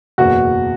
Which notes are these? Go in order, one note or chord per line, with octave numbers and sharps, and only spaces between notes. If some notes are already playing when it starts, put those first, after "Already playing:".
F#1 E2 B2 F#4